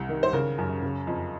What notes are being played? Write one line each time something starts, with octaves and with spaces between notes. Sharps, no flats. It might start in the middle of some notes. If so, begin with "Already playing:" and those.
Already playing: C2
D#3
C5
C#3 A#4
F#2
C#3
F2